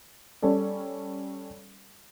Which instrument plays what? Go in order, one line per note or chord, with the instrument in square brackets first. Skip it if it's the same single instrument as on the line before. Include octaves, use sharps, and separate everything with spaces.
[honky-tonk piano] G3 C#4 A4 D5